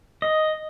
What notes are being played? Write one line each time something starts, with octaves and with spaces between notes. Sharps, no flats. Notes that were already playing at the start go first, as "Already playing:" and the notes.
D#5